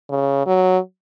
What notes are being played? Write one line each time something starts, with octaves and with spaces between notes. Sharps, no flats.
C#3
F#3